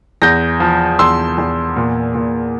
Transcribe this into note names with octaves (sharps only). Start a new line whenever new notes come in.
E2 G6 A#6
F3
E2 C6 E6
E2
A#2
A#2